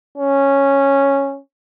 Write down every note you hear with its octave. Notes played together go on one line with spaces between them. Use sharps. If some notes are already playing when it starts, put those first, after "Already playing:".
C#4